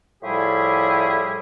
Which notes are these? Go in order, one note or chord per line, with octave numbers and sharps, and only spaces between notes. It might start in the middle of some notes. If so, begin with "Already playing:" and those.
A2 F3 G3 E4 G4 G#4